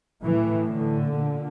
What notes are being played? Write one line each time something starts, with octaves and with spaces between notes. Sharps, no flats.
A2 E3
D3
A#2